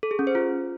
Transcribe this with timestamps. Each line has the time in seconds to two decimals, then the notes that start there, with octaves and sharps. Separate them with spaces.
0.03 A4
0.11 G#4
0.19 C#4
0.27 C5
0.35 F4